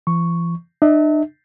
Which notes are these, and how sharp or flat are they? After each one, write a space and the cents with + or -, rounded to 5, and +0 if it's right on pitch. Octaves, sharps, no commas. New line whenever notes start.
E3 +45 C#6 +0
D4 +45 E5 -40